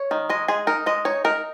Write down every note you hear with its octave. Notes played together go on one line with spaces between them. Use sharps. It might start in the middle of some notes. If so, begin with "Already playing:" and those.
Already playing: C#5
D#3
G#3 D#5
G#3 G#4
D#4 A#4
G#3 D#5
D#4 C#5
D#4 A#4